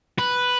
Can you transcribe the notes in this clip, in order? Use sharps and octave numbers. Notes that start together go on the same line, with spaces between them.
B4